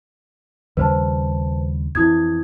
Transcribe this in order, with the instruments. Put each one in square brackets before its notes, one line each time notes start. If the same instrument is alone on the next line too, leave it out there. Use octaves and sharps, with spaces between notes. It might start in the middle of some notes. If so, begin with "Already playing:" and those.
[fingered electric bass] D#2 C#3 G3 [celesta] B4 C5 A5
[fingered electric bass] F2 E3 [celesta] E4 D#6 G#6